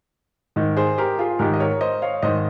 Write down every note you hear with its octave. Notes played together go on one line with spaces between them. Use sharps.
G#2 D#3
G#4 C5
G4 A#4
F4 G#4
G#2 D#3 G4 A#4
D#5
A#4 C#5
C5 D#5
C#5 F5
G#2 D#3 C5 D#5